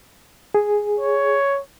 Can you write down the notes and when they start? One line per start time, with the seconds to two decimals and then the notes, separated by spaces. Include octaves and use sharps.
0.54 G#4
0.99 C#5